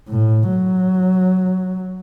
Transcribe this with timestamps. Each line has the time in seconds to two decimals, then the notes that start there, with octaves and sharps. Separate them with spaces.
0.09 A2
0.49 F#3